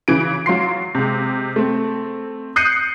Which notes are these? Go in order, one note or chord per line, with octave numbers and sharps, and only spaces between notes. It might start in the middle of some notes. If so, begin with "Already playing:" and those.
C#3 E3 D7
F#3 F4 C6 C7
C3 G#3
A3 C4
D#6 F#6 G6 C7 C#7 D#7